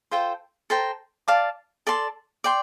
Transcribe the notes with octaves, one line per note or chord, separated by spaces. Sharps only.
F4 A4 C5 G5
A4 C5 G5 A#5
D5 F5 A5 D6
A4 D5 A5 C6
D5 G5 C6